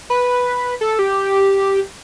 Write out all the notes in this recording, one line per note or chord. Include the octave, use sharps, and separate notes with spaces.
B4
A4
G4